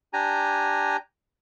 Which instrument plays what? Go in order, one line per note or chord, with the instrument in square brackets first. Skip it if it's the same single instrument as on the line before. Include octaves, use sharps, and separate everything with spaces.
[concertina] D4 G4 G#5 A#5